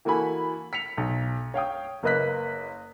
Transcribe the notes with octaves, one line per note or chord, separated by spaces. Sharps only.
E3 A#3 F#4 A4 G#5 B5
B6 C#7 F7
B1
C#5 F5 G5 D#6
F#1 A#3 B4 D#5 F#6 B6